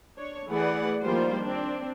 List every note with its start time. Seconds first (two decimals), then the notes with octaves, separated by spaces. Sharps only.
0.17 D4 C#5
0.48 E3 A3 G#4 B4 D5 F#5
1.03 D#3 F3 G3 A#3 F4 C5
1.42 C4 D4